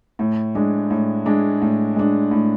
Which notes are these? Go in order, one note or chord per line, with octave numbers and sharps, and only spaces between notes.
A2
G#3 D4
A2
G#3 D4
A2
G#3 D4
A2